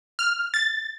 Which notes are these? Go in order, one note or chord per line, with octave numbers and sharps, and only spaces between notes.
F6
A6